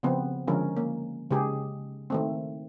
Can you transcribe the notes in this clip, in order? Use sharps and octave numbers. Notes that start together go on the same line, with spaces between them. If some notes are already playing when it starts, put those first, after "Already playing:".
C#3 F3 B3 C4
D3 F3 G#3 C#4 A#4
A#3
C#3 G#3 G4 G#4
D#3 A3 C4